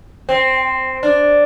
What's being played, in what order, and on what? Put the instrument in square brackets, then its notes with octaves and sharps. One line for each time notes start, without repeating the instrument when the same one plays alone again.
[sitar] C4
D4